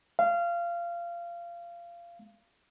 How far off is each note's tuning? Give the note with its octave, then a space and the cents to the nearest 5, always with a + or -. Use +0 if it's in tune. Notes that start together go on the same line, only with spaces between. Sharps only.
F5 -20